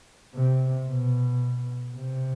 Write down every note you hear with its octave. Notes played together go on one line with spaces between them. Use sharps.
C3
B2
C3